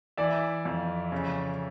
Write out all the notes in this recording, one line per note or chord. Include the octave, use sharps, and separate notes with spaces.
E3 D5 E5
F2
C#3